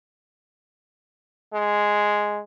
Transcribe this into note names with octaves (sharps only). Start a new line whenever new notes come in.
G#3